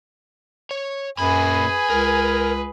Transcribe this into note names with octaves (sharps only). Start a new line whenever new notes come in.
C#5
F#2 A#2 G#4 B4 G#5 B5
C#2 A#4